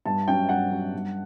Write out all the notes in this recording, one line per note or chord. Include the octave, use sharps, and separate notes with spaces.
G2 A5
F#3 C#4 G5
G2 F#5
F#3 C#4
G2